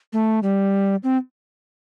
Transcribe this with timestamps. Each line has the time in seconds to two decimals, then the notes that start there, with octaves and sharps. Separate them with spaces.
0.13 A3
0.43 G3
1.04 C4